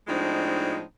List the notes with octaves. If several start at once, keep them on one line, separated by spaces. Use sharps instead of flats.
A2 F3 G#3 C4 D4 D#4